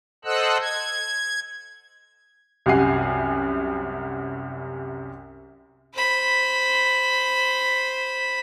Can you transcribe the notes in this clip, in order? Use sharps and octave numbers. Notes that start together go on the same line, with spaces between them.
A4 C5 D#5 F#5 E6 F#6
G#6
C2 F#2 G4 F#5 G#5 C7
C5 B5